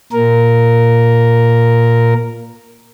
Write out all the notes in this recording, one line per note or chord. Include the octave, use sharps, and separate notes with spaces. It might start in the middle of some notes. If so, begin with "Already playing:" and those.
A#2 A#4